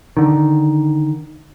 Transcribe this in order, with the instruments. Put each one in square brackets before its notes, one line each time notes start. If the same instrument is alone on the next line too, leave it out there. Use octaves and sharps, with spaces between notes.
[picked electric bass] D3 D#3